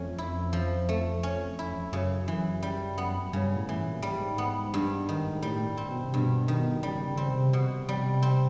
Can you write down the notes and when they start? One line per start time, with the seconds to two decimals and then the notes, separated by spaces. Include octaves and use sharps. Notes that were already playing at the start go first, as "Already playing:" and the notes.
Already playing: F2 A3 C#4
0.18 E4
0.53 F3
0.89 A3
1.23 C#4
1.59 E4
1.93 F#2 C#3
2.28 E3
2.63 G3
2.98 B3
3.33 G2 C#3
3.56 A2
3.69 E3
3.80 A#2
4.02 G#2 G3
4.38 B3
4.74 G2
5.09 D#3
5.35 G#2
5.42 A2 G3
5.77 C4
5.90 B2
6.03 C3
6.14 G2 B2
6.48 D#3
6.83 C#3 G3
7.07 C#3
7.17 C4
7.30 C3
7.53 B2
7.89 G3
8.22 C4